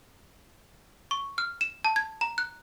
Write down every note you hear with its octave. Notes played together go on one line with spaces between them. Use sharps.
C#6
F6
E7
A5
G#6
A#5
F#6